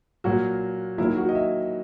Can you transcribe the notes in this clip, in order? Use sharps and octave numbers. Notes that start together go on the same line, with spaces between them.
A#2 F#3 A#3 F#4
D#3 F#3 A#3 E4
F#4
D#5
E5